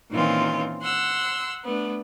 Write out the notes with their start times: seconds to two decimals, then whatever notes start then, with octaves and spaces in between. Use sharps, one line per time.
0.12 A#2 D#3 E3 C4 C#4 F4
0.83 F#5 C6 E6
1.65 A3 B3 D4